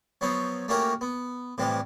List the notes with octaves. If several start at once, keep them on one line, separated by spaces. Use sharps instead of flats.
F3 F#3 B3 C5 C#5
A3 A#3 C#4 F#4 G4 A#4
B3
A2 C3 E3 F3 G3